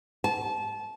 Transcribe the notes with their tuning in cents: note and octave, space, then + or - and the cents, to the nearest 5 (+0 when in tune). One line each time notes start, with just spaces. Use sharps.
A5 -25